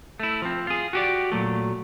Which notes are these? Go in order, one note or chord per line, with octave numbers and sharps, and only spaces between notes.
A3 E4
F3 C4
F4 G#4
F#4 G4 D5
A#2 F#3 A3